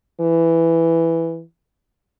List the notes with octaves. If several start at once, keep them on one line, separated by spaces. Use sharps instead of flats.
E3